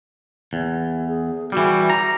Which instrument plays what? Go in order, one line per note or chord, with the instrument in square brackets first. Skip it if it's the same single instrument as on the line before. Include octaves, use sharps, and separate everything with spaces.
[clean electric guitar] E2
[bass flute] G#4
[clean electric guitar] E3 G3 [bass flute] F#4
[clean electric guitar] A#5